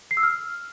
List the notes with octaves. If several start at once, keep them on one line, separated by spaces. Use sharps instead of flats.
C7
E6
F6